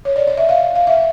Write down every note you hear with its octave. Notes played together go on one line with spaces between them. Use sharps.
C#5
D5
D#5
E5
F5
F5
E5